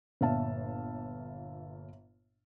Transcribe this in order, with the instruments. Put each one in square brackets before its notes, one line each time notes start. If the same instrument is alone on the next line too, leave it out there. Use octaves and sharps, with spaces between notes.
[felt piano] G1 A#2 C#5 E5 F5 A5